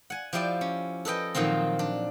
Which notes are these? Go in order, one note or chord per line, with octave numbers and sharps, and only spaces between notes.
F#5 G#5
F3 E4 G4 D5 G5
C#4
A4 B4 D#5 G5
A#2 D#3 F3 F#3 C4
D4